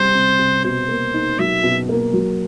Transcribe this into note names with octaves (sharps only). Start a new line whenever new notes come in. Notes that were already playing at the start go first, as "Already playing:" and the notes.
Already playing: C3 G3 C5
C3
C3
B2 C5
A#3
D#4
F#3 E5
B2
A#3
F#3